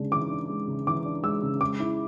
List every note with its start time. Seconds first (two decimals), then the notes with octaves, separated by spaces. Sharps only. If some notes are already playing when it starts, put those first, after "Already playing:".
Already playing: C#3 G#3 D4
0.12 E3 D6
0.31 D4
0.49 G#3
0.67 C#3
0.87 E3 D6
1.05 D4
1.24 G#3 E6
1.43 C#3
1.61 G#3 D6
1.80 E4